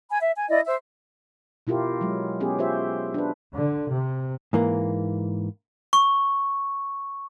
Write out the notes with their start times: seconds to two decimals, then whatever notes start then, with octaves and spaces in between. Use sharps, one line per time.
0.10 G#5 B5
0.21 E5
0.36 G#5
0.50 E4 D5 D#5
0.66 C5 E5
1.67 B2 E4 F4 G4 A#4
2.01 F#3 G#3
2.40 B3 C#4 G4 G#4
2.59 F4 G4 C5 E5
3.14 D4 B4
3.55 D3
3.90 C3
4.53 G#2 E3 A#3
5.93 C#6